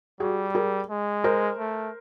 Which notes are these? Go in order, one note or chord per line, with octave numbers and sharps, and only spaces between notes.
G3 F#4 G#4
G#4 A#4
G#3
A#4 C5
A3